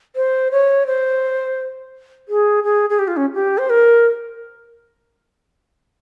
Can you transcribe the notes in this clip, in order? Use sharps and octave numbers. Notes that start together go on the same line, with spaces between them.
C5
C#5
C5
G#4
G#4
G#4
G4
F4
C#4
G4
C5
A#4